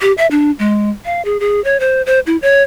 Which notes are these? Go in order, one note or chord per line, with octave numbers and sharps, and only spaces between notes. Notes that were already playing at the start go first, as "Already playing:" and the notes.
G4
E5
D4
G#3
F5
G#4
G#4
C#5
C5
C5
E4
C#5